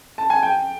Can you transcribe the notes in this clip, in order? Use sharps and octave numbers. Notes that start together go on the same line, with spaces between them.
A5
G#5
G5